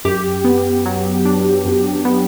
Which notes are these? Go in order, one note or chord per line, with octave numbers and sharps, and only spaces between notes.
F#2 G4
B3
F#3
D4
F#2
B3